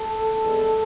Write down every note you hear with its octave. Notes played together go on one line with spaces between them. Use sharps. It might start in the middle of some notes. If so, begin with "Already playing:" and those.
Already playing: A4
E2 B2 G#3